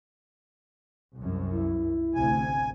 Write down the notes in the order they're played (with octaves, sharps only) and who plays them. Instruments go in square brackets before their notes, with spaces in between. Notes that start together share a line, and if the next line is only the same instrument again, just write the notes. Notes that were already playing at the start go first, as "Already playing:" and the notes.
[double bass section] C2 F#2
[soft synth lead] E4
[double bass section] A1 D2 C3 [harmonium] G#5